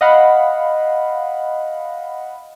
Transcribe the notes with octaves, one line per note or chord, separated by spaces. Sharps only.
D#5 F5 F#5 B5